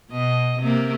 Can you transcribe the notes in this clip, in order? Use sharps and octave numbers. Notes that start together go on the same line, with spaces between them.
B2 D#5
C3 A#3